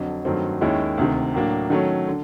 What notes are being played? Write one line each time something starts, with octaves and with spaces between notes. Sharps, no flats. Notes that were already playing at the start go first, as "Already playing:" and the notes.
Already playing: F2 D3 F#3
G2 D#3 F#3 A3 C4
D#2 D#3 G#3 C#4 E4
D2 C3 D#3
A2 F#3 A#3 D4
D#3 F#3 A3 C#4
D3